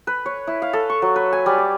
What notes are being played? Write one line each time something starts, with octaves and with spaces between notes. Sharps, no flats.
B4
C#5
E4
F5
A4
C#6
F#3
B4
G#5
G3
D6